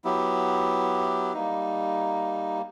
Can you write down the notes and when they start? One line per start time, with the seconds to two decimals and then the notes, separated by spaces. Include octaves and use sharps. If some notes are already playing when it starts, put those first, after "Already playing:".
0.05 F#3 B3 E4 G4
1.33 G3 A#3 D#4